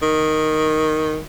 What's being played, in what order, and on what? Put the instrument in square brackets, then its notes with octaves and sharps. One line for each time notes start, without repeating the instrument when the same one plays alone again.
[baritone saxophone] D#3